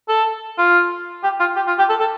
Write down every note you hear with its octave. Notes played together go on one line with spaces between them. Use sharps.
A4
F4
G4
F4
G4
F4
G4
A4
A4